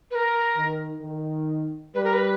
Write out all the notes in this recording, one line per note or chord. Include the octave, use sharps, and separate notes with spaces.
B4
A#4
D#3
D#3
G3 B4
A#4
B4